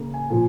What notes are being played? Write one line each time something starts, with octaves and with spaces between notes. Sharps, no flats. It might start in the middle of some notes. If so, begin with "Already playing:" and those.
Already playing: C#3 A#3
G#5
A#2 F3 G#5